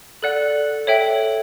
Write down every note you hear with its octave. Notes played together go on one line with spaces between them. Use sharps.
A4 D5 F#5 F#6
A4 C#5 E5 G5